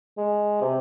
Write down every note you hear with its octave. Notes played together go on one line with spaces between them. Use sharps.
G#3
C3